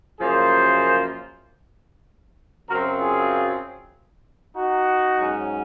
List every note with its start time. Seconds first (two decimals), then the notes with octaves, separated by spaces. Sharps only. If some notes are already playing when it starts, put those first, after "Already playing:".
0.21 F#2 C#3 F3 A#3 G#4 C5
2.69 F#2 C#3 F#3 C4 F#4 A#4
3.00 F4 G#4
4.55 D#4 F#4
5.18 G#2 F#3 C#4